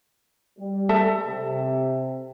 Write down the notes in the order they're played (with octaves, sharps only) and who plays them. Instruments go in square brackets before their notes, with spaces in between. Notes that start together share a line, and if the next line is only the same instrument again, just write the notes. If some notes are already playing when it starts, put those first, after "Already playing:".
[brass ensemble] G3
[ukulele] A4 E5 A5
[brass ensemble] C3